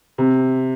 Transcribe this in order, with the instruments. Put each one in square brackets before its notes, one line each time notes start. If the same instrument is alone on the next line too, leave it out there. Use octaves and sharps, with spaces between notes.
[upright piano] C3